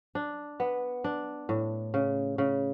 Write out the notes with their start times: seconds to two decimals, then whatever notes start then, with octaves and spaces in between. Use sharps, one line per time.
0.15 D4
0.60 B3
1.04 D4
1.49 A2
1.94 C#3
2.38 C#3